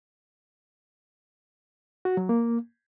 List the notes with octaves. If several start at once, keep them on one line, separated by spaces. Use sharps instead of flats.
F#4
F#3
A#3